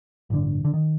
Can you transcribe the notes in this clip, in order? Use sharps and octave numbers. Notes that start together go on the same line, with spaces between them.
A1 G2 D3
D3
D#3